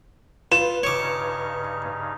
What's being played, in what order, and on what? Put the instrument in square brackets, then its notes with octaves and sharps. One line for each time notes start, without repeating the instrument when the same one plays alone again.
[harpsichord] F4 [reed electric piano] B4 [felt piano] E7
[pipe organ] G2 C#3 D#4 [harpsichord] C#5 D6